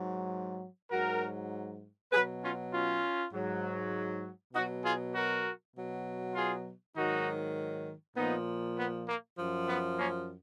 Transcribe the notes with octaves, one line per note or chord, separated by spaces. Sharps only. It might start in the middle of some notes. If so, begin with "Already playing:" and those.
Already playing: G#2 F#3
G#2 F#3 F#4 A#4
B2 F#3 G#4 B4
C#4 F4
C#4 F4
G#2 F#3
B2 F#3 D#4 F#4
F4 G#4
F#4 A#4
B2 F#3
F4 G#4
G#2 D#3 F#3 D#4 F#4
A#2 F3 B3 D#4
B3
A#3
F#2 F3
B3
A#3 C#4